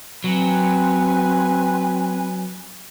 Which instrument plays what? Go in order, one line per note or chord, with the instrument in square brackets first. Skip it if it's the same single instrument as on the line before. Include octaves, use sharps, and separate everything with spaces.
[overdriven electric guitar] F#3 [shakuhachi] C4 [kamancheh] B4 G#5